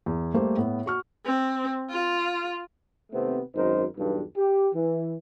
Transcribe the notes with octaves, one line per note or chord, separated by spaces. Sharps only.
E2
G3 A3 A#3 C5
A2 B3
F#4 C#6 F6
C4
F4
D#2 C3 A3 B3 C4
G#1 F#2 D#4 A#4 C5
B1 E2 G2
G4
E3